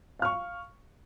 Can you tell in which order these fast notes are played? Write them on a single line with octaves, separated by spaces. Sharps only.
F5 F6 C#6